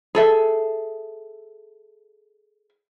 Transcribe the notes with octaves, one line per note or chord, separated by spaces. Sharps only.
G#4 A4 E5